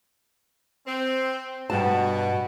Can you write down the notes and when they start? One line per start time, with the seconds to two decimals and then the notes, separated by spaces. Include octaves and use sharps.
0.87 C4
1.70 G2 B2 F#4 A5